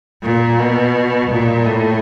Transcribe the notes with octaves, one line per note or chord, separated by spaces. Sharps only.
A#2
B2
A#2
A2